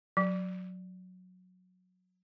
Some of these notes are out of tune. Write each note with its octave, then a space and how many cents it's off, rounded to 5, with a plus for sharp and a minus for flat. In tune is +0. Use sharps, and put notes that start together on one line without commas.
F#3 -15